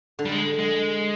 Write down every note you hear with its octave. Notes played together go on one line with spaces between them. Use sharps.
D3
G3
G#3
G#3